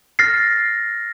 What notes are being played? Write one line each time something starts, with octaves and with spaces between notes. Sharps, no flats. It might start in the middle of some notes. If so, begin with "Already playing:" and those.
F6 A6 A#6 C7